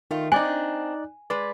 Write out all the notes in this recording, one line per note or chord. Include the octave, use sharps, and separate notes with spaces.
D#3 A3 F4
C4 D4 D#4 D5 G#5 F#6
G#3 B4 D5